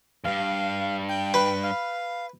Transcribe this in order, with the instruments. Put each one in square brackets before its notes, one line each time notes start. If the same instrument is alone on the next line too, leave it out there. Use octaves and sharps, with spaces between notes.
[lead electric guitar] E2 G2 [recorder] F5
[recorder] G5
[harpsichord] B4
[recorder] F5